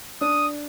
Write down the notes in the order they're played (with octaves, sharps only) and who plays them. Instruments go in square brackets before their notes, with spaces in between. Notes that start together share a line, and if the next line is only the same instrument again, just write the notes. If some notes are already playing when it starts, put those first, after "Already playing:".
[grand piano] D4 [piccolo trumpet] D#6